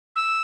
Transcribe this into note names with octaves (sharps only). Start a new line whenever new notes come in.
E6